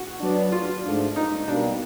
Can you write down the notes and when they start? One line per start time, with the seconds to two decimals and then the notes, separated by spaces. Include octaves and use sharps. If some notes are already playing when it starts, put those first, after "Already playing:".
Already playing: F#4
0.21 F#3 B3 D4
0.52 F4
0.84 G#2 F3 A3 D4
1.16 D#4
1.47 B2 G3 A#3 D4